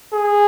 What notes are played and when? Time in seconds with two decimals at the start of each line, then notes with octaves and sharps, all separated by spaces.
0.14 G#4